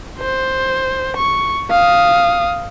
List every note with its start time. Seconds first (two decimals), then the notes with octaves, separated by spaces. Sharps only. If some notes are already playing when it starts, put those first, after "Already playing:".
0.19 C5
1.17 C#6
1.71 F5 D#6